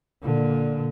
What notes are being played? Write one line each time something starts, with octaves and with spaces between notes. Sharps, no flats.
A#2 D3